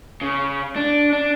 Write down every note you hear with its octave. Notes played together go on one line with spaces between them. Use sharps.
C#3
D4
D4